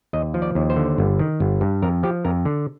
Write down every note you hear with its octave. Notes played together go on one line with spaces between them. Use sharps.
D#2 D#5
F3
D5
D#2
C5
D3
G1
D#3
G1
G2
F2 A#4
F3 G4
F2 A#4
D3